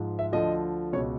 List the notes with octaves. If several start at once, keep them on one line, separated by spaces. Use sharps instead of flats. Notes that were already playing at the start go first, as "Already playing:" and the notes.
Already playing: G#2 F3
E5
D2 D3 F3 D#5
C#2 B2 C#5